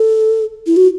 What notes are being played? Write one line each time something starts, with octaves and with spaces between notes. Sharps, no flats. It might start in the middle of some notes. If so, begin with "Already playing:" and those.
Already playing: A4
E4
F#4